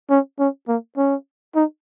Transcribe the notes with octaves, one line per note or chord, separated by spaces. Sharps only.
C#4
C#4
A#3
C#4
D#4